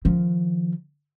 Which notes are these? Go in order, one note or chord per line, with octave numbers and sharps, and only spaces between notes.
D#3 F3